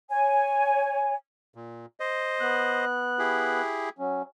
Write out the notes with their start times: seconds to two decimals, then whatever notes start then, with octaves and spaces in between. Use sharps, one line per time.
0.10 C#5 G#5
1.55 A#2
2.00 C5 D#5
2.41 B3 F#6
3.19 E4 G4 G#4
3.98 F#3 C#4